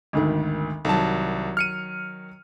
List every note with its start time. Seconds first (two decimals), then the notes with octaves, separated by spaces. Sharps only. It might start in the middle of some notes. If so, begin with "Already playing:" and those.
0.13 G#1 D2 D#3
0.85 C2 D#3 F#3 A5
1.57 F6 C#7 D#7